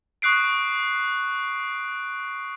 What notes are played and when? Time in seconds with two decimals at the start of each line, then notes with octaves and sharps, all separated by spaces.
0.22 C#6 D#6 F#6 C7 D7